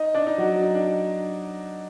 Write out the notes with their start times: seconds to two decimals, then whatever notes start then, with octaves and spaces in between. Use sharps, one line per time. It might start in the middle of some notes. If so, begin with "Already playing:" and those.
Already playing: D#4 D#5
0.15 D4 D5
0.27 D#4
0.38 F#3 F#4
0.63 D#4
0.75 D4